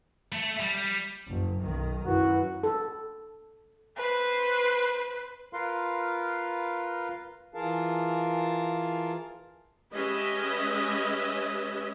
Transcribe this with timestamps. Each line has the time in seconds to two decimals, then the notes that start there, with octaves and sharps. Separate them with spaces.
0.32 A3
0.60 G3
1.30 F#1
1.62 B1 D#3
2.06 F#2 E4 F#4 B4 F#6
2.63 A4
3.97 B4 C5
5.53 F4 A#4 B4 F5 C6
7.54 E3 F4 G#4 A#4 F5 A5
9.94 G#3 C#4 G4 B4 D#5 E5